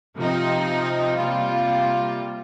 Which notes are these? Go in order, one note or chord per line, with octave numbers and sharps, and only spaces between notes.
C3 F3 C4 D#4
C3 G3 A#3 F4